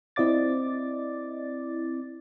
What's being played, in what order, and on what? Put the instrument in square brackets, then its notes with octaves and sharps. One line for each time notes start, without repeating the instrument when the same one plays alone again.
[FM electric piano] C4 E4 D5 D#5 D6 A6